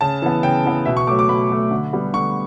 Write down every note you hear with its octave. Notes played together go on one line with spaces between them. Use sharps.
C#3 A5
E3 B3
C#3 G5
E3 B3
B2 E5
C#6
F#3 A3 D6
D6
B2 B5
F#3 A3
D3
G3 B3
D3 C#6